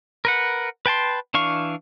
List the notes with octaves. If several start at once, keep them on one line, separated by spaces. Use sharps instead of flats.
A#4 B4 F#5
B4 G5 A5 C6
E3 D4 F5 C#6